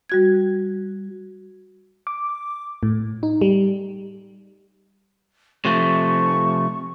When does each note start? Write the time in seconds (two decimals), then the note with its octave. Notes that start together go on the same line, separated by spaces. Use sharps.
0.10 G3 F#4 G#6
2.07 D6
2.83 A2
3.23 D#4
3.41 G3
5.65 C3 F3 A3 C#6